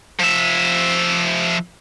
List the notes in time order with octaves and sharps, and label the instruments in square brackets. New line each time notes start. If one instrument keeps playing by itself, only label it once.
[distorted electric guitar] F3 E5